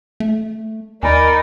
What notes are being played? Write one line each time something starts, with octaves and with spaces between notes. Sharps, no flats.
A3
D#2 D#4 A#4 D5 G#5 B5